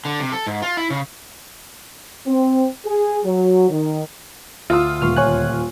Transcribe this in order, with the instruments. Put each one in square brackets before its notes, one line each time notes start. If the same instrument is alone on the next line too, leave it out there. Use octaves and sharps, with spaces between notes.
[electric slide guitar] D3
C3
A4
G#2
F4
E4
C#3
[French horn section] C4
G#4
F#3
D#3
[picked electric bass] D2 [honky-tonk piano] F4 [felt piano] F5 D#6 E6
[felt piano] D#1 C#6 [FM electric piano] C6 F6
[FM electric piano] C#5 G#5 F#6